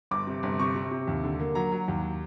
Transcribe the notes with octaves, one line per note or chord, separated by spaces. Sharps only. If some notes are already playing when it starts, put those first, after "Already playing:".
G1 D6
C3
G1
C3 C#6
C3
C3
D#2
D3
A#3
F#3 A#5
F#3
D#2